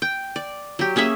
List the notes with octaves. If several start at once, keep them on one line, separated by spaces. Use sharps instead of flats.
G5
D5
F#3 G4
A#3 C#4 G#4 E5